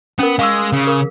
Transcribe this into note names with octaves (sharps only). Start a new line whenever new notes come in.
B3 C#4 A#4
G#3 F5 C#6 E6
C#3
G#4 A#4